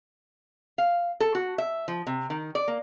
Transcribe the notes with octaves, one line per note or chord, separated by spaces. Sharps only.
F5
A4
F#4
E5
F3
C3
D#3
D5
A#3